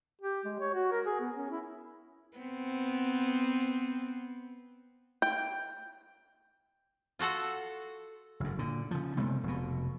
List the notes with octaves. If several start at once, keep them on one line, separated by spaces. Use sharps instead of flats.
G4
G#3
C#5
F#4
A#4
G#4
B3
C#4
E4
B3 C4
G5
F4 F#4 A4 F#5
F#1 F#2
A#2 D3
C#3 F3
C3 G#3 A3 B3
F1 B2